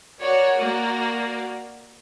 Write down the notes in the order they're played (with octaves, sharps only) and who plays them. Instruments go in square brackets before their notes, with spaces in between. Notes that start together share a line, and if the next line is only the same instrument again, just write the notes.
[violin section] F#4 A#4 D5 [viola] C#5
[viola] A#3